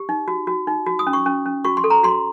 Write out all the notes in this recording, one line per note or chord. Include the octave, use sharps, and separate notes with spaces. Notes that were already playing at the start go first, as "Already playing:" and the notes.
Already playing: G4
D#4
F#4
F#4
D#4
F#4
D#6
C#4
C#6
C#4
C#4
F#4 C#6
C6
A4
A#5
F#4 C6